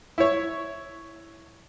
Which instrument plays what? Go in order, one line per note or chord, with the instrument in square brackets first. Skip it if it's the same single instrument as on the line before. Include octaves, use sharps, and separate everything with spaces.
[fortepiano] E4 C#5